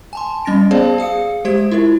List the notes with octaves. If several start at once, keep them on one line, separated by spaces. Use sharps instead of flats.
G#5 A5 C6
G3 C#4 A6 A#6 D7
B3 G#4 C5 D5 F5 A5
G#4 F5 D#6 C#7
G#3 G4 C5 G#6 D7
E4 F4 A#4 E5